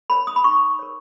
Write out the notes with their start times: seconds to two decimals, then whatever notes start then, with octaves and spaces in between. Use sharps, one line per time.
0.10 A#4 C#5 B5
0.27 D#6
0.36 B5
0.44 D#4 C#6
0.79 A#4 C#5